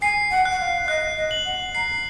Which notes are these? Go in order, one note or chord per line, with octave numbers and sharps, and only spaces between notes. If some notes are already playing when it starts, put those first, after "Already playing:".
G#5 C7
F#5
F#6
F#5
F5
F5
D#5 F#6
D#5
F#7
F#5
A#5 C7